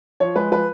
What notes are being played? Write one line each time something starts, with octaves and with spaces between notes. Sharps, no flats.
F3 C#5
G#3 B4
F3 B4